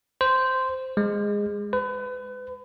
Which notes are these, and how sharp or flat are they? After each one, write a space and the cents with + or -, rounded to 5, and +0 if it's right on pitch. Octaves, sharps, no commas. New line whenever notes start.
C5 -10
G#3 -15
B4 +35